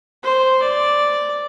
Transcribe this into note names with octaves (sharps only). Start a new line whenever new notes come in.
C5
D5